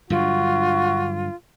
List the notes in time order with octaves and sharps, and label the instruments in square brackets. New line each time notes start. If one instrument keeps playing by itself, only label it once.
[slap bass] G2 D3 F#3 [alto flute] F4 [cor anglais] F#4